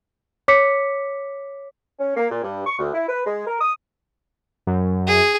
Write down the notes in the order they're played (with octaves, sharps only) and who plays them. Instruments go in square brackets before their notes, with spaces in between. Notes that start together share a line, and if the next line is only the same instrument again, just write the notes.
[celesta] C#5 D6 B6 C#7
[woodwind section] C#4
A#3
A#2
G2
C#6
D2
E4
B4
G#3
A#4
D#6
[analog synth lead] F#2
[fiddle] G#4